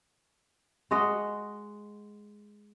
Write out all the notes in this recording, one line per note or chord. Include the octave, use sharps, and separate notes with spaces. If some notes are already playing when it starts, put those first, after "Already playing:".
G#3 F#4 D#5 F#5